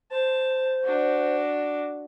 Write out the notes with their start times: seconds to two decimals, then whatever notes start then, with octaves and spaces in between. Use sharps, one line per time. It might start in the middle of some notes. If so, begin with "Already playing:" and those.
0.11 C5 A5
0.84 D4 F#4